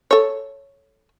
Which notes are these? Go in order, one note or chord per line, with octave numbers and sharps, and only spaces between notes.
A4 C#5